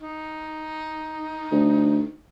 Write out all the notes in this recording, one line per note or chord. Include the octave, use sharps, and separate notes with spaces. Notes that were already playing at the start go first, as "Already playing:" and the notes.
D#4
D2